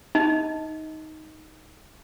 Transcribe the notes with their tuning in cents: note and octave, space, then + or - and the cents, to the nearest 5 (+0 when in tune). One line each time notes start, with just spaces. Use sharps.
D#4 +5 D#5 +30